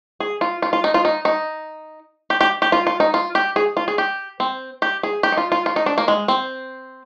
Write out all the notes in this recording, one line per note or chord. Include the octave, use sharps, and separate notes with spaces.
G#4
F4
F4
F4
D#4
F4
D#4
D#4
G4
G4
G4
F4
F4
D#4
F4
G4
G#4
F4
G#4
G4
C4
G4
G#4
G4
D#4
F4
F4
F4
D#4
D4
A#3
G#3
C4